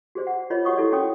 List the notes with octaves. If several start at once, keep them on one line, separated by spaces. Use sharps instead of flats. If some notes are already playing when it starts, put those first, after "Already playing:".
F#4 G#4 C5 D5
F#5
F4 A#4 C#5 D#5 B5
F#4 C#5 F#5 C#6 D#6
E4 F#4 A4 A#4 D5
C#4 F#4 C#5 G5 D#6